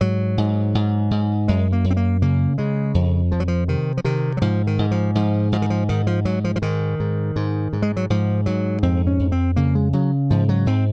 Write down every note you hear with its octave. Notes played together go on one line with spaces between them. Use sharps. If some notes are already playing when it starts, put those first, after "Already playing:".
G#2 F#3
G#2
G#2
G#2
F#2 G#3
A#3
F#2
C4
A#3
C#3 A#3
C#3 G#3
F2
F2 F3
F#3
F3
C3 D#3
F3
C3 D#3
F#3
G#2 F3
D#3
G#2
F3
G#2 F3
G#2 F3
D#3
F3
G#2 D#3
F3
G#2 F#3
F3
F3
G#2 D#3
G#2
G#2
G#2
G#3
F#3
G#2 F3
G#2 F#3
F2 C4
C#4
F2
C4
C#3 A#3
G#3
C#3 F#3
G#2 F3
F#3
G#2 C4